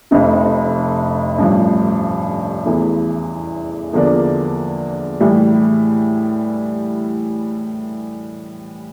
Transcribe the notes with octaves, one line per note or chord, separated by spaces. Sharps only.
F1 F2 C3
A1 G2 F3
E2 E3 A3
E2 D3 F3 A#3 D4
A2 E3 G3